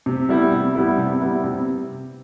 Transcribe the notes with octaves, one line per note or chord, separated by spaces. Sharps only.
C3
G3 B3 E4
C3
G3 B3 E4
C3
G3 B3 E4
C3